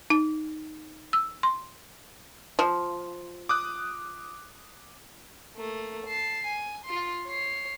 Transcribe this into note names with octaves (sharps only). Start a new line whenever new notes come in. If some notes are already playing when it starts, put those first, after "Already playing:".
D#4
E6
C6
F3
D6 D#6 F#6
A3 A#3
A5 C7
G#5
F4 C6
C#5 C7